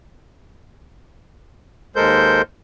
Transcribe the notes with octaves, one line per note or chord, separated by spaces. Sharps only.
D#2 G#3 A4 A#4 C5 G6